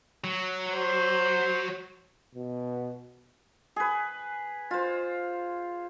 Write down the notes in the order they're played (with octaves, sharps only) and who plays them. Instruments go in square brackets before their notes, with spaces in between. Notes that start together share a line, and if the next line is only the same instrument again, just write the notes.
[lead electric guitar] F#3
[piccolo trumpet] C5
[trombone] B2
[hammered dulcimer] G#4 B4
F4 C5